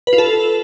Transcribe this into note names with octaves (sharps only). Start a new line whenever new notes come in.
B4
F4
A4